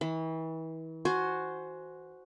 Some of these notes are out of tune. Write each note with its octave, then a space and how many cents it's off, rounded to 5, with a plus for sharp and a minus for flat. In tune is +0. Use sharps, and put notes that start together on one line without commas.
E3 -35 B5 +40
F#4 +0 C5 +0 G#5 +20